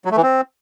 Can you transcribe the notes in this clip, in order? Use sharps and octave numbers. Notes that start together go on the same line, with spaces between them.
F#3
A3
E3
C4